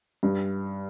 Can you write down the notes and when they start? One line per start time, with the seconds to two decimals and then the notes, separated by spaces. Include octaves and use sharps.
0.23 G2